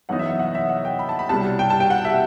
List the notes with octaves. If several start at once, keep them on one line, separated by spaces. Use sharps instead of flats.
F#2 E3 B3 D#4 F#5
E5
E5
F#5
E5
F#5
G5
B5
A5
B5
C2 B2 G3 A5
G5
A5
G5
F#5
E5